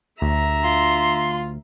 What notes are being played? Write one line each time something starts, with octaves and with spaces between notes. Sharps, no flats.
D2 E5 A#5
F4 C6